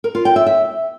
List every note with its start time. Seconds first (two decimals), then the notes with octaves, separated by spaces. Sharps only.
0.04 A#4
0.15 F4
0.25 G5
0.36 E5
0.46 E5